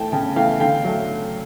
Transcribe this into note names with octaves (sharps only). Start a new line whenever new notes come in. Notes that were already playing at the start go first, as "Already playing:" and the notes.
Already playing: E3 A3 G5 A5
C#3 G5 A5
E3 A3 F5 G5
D3 F5 G5
F#3 A3